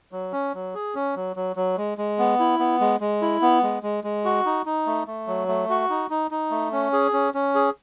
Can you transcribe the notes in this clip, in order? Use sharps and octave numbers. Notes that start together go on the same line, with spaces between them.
F#3
C#4
F#3
G#4
C#4
F#3
F#3
F#3
G#3
G#3
B3
E4
B3
G#3
G#3
E4
B3
G#3
G#3
G#3
F#4
D#4
D#4
A3
A3
F#3
A3
F#4
D#4
D#4
D#4
A3
C#4
G#4
C#4
C#4
G#4